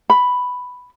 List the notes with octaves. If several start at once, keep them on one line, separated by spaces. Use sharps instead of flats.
B5